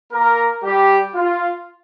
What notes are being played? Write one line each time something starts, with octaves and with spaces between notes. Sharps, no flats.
A#3 A#4
G3 G4
F4